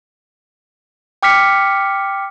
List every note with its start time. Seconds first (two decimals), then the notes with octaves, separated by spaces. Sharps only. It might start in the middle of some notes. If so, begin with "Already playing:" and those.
1.23 G5 D6 F6 B6 C#7